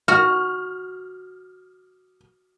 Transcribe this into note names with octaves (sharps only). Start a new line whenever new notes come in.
F#4 F6